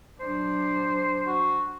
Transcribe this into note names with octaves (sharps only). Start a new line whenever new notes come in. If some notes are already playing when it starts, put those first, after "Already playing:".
F#3 D4 C5
F#4